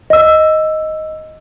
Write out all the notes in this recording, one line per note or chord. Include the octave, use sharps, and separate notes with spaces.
D#5 E6